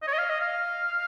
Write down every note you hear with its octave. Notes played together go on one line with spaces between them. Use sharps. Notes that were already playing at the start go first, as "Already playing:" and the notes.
D#5
C#5
D#5
F5
D#5
F5